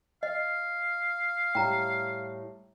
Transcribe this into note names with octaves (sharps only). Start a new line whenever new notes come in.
D#5 F5
A2 G3 G5 A#5